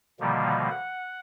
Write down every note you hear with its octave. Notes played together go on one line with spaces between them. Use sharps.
B2 D3 D#3 F3 G3 A#3
F#5